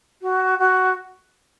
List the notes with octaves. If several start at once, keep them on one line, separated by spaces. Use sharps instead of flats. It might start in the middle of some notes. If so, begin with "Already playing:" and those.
F#4
F#4